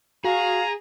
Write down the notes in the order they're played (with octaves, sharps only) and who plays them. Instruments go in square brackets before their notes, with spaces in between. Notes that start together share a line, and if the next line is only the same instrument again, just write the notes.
[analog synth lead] F#4 [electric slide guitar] G#4 [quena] F5 [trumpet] A#5